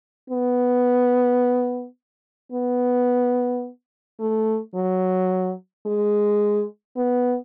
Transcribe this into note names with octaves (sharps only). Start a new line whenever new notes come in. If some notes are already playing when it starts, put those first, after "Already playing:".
B3
B3
A3
F#3
G#3
B3